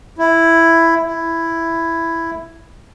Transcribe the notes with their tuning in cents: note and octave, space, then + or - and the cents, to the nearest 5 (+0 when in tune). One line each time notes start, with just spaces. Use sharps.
E4 +5
E4 +5